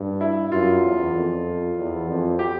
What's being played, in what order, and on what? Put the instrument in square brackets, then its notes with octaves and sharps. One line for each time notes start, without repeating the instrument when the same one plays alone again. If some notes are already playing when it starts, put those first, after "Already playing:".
Already playing: [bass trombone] G2
[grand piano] E4
[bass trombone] F#2 [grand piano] F4
[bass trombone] E2
F2
E2
F2
[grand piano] G4